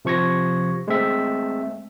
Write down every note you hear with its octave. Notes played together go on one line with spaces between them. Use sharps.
C3 F3 C#6 G#6 A#6
G#3 A3 C4 E5